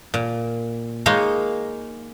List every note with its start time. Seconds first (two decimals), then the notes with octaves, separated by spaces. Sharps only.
0.14 A#2
1.06 G#3 A#3 D#4 C#5 F5